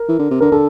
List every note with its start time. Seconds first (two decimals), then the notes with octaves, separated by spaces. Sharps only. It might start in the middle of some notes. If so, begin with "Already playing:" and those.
Already playing: A#4
0.09 E3
0.19 D3
0.31 C3
0.40 D3 A#4
0.52 D3 A4